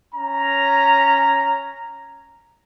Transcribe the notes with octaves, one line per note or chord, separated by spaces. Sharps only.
C#4 A#5